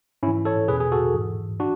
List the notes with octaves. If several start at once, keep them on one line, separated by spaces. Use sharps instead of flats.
G#2 E3 C#4 E4
A4 C#5
E2 B2 G#4 B4
G#4
F#4 A4
G#2 E3
D4 F#4